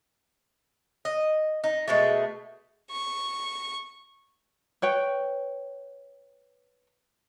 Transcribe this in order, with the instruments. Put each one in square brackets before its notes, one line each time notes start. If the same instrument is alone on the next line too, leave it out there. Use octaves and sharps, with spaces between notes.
[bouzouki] D#5
D#4
B2 G#3 A3
[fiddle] C#6
[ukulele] B4 C#5 G5